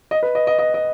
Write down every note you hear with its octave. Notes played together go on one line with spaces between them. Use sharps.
D#5
B4
D#5
D#5
D#5
D#5